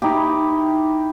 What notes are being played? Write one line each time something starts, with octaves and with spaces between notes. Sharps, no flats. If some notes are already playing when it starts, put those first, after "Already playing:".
D#4 E4 G4